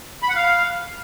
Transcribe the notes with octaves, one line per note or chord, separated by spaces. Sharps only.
B5
F#5
F5